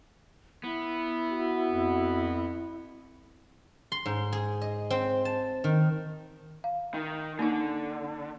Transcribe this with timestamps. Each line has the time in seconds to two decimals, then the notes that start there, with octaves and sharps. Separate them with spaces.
0.64 B3 E4
1.31 F#4
1.70 F2
3.92 C6
4.06 G#2
4.33 G#4
4.61 D#5
4.90 C4
5.25 A5
5.64 D#3
6.64 F5
6.94 D#3
7.39 D3 A#3 D#4